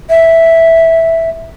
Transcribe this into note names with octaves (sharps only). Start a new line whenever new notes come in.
E5